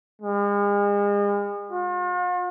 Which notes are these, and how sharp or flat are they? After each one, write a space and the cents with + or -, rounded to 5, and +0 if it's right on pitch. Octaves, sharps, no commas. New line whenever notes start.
G#3 -40
F4 +45